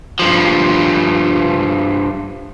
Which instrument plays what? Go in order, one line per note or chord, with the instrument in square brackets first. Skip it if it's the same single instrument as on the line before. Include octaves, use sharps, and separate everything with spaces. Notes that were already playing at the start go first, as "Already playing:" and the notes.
[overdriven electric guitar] G2 F3